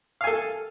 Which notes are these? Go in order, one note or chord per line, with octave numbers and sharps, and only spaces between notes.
A4 F5 G#5